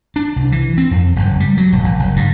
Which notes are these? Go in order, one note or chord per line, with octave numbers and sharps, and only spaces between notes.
D4
C2
E3
C4
F2
F#1
G3
F#3
E1
A#1
F#1
G2